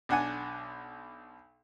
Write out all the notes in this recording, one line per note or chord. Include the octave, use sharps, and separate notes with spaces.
B1 D4 F#5 G#5